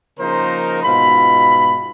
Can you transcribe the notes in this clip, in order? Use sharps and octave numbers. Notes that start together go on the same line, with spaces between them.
C#3 F3 A#3 D#4 A#4 C5
G#2 B2 F4 B5